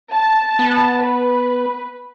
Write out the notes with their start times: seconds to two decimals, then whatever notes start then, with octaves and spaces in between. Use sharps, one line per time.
0.13 A5
0.59 B3
1.02 B4